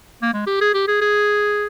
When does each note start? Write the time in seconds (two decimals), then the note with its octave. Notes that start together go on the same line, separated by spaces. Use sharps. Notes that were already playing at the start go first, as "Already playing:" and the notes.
0.22 A#3
0.33 G#3
0.47 G4
0.61 G#4
0.74 G4
0.88 G#4
1.01 G#4